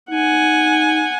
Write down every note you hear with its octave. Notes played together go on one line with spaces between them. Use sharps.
D#4 F#5 G#5